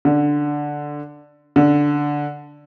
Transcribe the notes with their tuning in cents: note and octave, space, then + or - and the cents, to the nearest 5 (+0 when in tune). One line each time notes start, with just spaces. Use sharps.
D3 +0
D3 -5